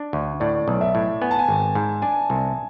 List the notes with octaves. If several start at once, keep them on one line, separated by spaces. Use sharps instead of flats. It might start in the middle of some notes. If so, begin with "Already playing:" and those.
Already playing: D4
D2
A2 D5
B1
E5
A2
B3 G#5
A5
G#5
G#1
G#2
D4 G#5
C2